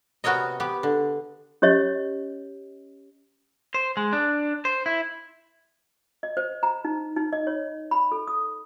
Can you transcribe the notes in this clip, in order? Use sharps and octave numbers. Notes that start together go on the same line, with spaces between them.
C3 B3 F#4 A#4 C#5 D#5
B3 G4
D3
C#4 G4 C#5 D#5
C5
G#3
D4
C5
E4
D#5
C5
A#5
D#4
D#4
D#5
C#5
B5
A4
D#6